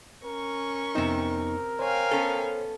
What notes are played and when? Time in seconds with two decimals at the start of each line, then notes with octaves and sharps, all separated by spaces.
0.24 C#4 A#4 C#6
0.95 F2 C3 B3 C4 D#4
1.79 C5 C#5 F5 G5 G#5
2.11 B3 C#4 A4